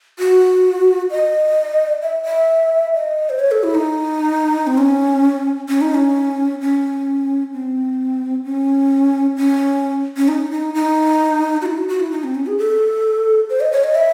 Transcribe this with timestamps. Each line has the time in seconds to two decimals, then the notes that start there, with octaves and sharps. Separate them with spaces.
0.19 F#4
1.11 D#5
2.02 E5
2.25 E5
2.94 D#5
3.30 C5
3.39 C#5
3.51 A4
3.63 E4
3.75 D#4
4.67 C4
4.78 C#4
5.69 C#4
5.81 D#4
5.94 C#4
6.61 C#4
7.53 C4
8.44 C#4
9.36 C#4
10.17 C#4
10.28 D#4
10.51 D#4
10.74 D#4
11.62 F#4
11.66 E4
11.78 F#4
11.88 F#4
12.00 E4
12.11 D#4
12.24 C4
12.35 C#4
12.46 G#4
12.58 A4
13.50 C5
13.61 D#5
13.72 C#5
13.84 D#5
13.95 E5